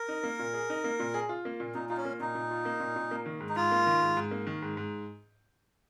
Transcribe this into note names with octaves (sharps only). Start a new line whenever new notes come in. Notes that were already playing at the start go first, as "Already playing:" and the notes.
Already playing: A#4
D#4
A#3
A#2
G#4
D#4
A#3
A#2
G#4
F4
A#3
A#2
A#2 D#4
D#4 F4
C#4
A#3
A#2 D#4
A#2
F4
A#3
A#2
A#2
A#3
D#3
G#2
D#4
G#2 F4
A#3
D#3
G#2
G#2
A#3
D#3
G#2
G#2